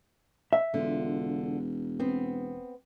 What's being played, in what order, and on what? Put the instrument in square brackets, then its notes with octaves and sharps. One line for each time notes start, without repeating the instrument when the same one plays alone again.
[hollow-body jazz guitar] E5
[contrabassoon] E1 [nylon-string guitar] D3 F4
[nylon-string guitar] B3 C4